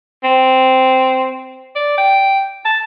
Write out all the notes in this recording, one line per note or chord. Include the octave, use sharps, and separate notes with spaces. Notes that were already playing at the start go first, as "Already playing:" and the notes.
C4
D5
G5
A5